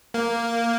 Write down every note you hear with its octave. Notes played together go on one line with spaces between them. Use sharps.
A#3